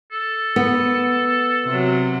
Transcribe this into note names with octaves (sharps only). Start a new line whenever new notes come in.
A4
B3
C3 F#3